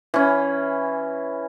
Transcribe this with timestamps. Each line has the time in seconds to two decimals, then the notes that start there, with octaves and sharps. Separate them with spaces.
0.14 E3 C#4